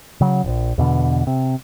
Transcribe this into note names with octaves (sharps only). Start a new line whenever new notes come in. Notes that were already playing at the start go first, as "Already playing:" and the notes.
C#3 F#3
E1 A#1
E2 B2 D3
C3